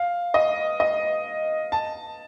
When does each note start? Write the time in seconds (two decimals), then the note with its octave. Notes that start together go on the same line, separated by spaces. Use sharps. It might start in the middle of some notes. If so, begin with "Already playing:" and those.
Already playing: F5
0.34 D#5
0.80 D#5
1.72 A5